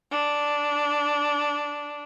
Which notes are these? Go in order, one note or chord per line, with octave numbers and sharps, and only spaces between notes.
D4